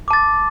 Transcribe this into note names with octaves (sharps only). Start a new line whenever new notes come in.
A5 D6 A6